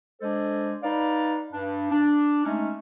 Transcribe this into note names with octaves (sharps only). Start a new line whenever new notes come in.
G#3 D4 A4 C5
D#4 B4 D5 F5
G2 D4
D4
G#3 A3 C#4 D#4